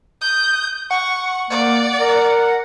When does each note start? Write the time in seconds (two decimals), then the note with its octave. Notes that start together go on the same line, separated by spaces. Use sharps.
0.21 D#6 G6
0.91 F#5 C#6
1.50 A#3 D5
1.99 A#4